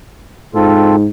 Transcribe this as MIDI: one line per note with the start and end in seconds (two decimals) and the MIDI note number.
0.54 1.07 44
0.54 0.96 60
0.54 0.96 65
0.54 0.96 69